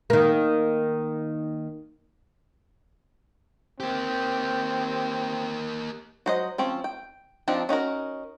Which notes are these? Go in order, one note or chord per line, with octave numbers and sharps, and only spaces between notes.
D#3 A#3
A#3 C4 G4
F#3 C5 D#5
F3 C4 C#4
G5
F3 C4 D4 D#4
C#4 D#4 F#4 A#4